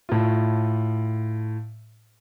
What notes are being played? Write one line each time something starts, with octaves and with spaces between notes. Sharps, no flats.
A2 F4